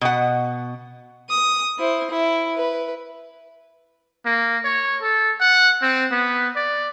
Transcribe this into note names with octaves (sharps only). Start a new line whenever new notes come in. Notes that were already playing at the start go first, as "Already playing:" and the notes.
B2 F#5
D#6
E4 C5
E4
B4
A#3
C#5
A4
F#5
C4
B3
D5